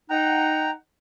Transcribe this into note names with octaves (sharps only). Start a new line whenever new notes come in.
D#4 F#5 G5 A#5